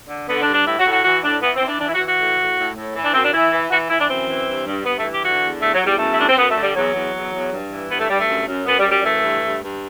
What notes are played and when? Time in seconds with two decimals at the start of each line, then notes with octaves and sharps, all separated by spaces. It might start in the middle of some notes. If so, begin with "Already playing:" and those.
0.09 D3
0.29 D3 B3
0.42 D4
0.48 G2
0.53 D4
0.67 A2 E4
0.79 F#4
0.86 A2
0.92 F#4
1.04 E3 F#4
1.24 A2 D4
1.42 E3 B3
1.56 C4
1.62 E3
1.68 D4
1.80 E3 D4
1.89 E4
1.94 F#4
2.00 E3
2.06 F#4
2.18 A2
2.38 A2
2.56 A2
2.76 A2
2.95 E3
3.04 D4
3.14 F#2 C4
3.24 D4
3.33 E3 E4
3.52 E3
3.71 E3 F#4
3.90 E3 E4
4.00 D4
4.09 F#2 C4
4.28 E3
4.47 G2
4.67 G2
4.85 G2 B3
4.98 A3
5.04 E3
5.13 G4
5.23 D3 F#4
5.42 E2
5.62 E2 A3
5.74 F#3
5.81 E2
5.87 G3
5.99 F#2 A3
6.12 E4
6.18 F#2 D4
6.29 C4
6.38 F#2 B3
6.51 A3
6.56 D3
6.63 G3
6.76 E2 F#3
6.94 E2
7.14 E2
7.33 E2
7.52 G2
7.71 E3
7.90 G2 B3
8.00 A3
8.08 G2 G3
8.19 A3
8.28 F#2
8.48 F#2
8.66 F#2 B3
8.79 G3
8.86 F#2
8.92 G3
9.03 E3 A3
9.23 G2
9.42 G2
9.62 G2